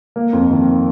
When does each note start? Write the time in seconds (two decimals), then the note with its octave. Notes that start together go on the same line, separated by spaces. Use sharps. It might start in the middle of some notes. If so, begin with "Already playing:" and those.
0.16 A#3
0.33 F2
0.51 D#3